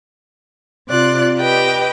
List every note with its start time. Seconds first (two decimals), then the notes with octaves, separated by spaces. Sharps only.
0.89 C3 F4 D5 F#6
1.38 G4 B4 D#5 G5